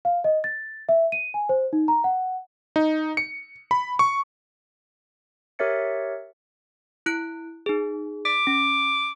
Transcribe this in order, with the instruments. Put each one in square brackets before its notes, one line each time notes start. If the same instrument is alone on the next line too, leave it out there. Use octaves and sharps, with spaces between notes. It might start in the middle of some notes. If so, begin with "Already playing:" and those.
[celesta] F5
D#5
A6
E5
D#7
G#5
C5
D#4
A#5
F#5
[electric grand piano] D#4
C#7
B5
C#6
[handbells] G4 A#4 C#5 E5 A6 C#7
E4 F#6 D7
D#4 G#4
[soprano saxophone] D6 [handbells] B6
[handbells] C#4